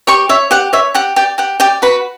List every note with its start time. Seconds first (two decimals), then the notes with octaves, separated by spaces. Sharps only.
0.07 G4 C#5 C#6
0.29 C#5 E5
0.51 G4 F#5
0.73 C#5 E5
0.94 G4 F#5
1.16 G4 D5 G5
1.38 G4 F#5
1.60 G4 D5 G5
1.82 F#4 B4 B5